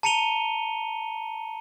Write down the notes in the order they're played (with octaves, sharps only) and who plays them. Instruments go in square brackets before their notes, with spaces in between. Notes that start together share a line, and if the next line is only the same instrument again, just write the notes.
[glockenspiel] A5 A#5 C#7 D#7 F7 G7